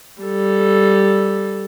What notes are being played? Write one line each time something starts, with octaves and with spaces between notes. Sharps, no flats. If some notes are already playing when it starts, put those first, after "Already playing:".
G3 A4